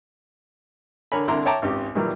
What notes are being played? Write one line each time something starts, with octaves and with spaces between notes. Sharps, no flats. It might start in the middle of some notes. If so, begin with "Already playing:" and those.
D3 A#4 C#5 G#5 B5
C2 D3 E4 A#5 C6 D6
C#5 E5 G5 A5 A#5 D6
G#1 C#2 G4
A#2 D#3 E3 F#3 G3